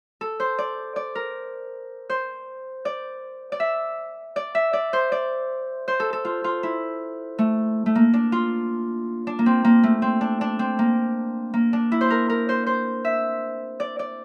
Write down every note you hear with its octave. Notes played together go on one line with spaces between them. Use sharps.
A4
C5
D5
D5
A#4
C5
D5
D5
E5
D5
E5
D5
C5
D5
C5
A4
A4
F4
F4
E4
A3
A3
A#3
D4
F4
D4
A#3
C4
A#3
A3
C4
D4
D4
C4
A#3
A#3
D4
E4
C5
A#4
A#4
C5
C5
E5
D5
D5